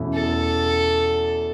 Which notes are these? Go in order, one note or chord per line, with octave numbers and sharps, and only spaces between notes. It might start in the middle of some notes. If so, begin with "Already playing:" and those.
Already playing: E2 B2 A3 C#4 E4
A4